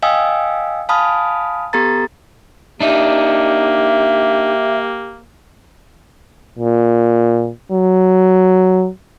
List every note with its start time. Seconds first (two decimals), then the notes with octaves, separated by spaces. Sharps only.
0.02 D#5 F5 G5 G#5 D#6 E6
0.89 F5 G#5 A5 B5 D#6 F6
1.73 B3 G4 A4 A#5 A6
2.81 A#3 D4 D#4 G4 E5
6.58 A#2
7.72 F#3